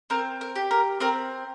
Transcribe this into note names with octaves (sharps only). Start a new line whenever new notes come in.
C4 A#4
A#4
G4
A#4
C4 A#4